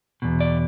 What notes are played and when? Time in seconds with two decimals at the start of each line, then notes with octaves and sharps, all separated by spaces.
0.22 E2 B2
0.40 D5